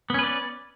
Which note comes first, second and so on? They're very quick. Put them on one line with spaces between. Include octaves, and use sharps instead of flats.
B3 C#4 B4 D5